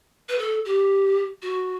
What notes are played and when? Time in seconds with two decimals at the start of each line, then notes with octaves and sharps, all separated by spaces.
0.29 B4
0.39 A4
0.65 G4
1.42 F#4